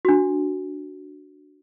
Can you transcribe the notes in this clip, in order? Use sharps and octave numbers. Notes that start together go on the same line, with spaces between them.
D4 F#4